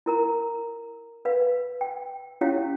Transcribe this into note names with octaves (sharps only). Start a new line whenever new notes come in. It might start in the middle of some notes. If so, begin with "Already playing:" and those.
E4 A#4 A#5
B4 F5
G5
C#4 E4 G4 C#5 F5 G5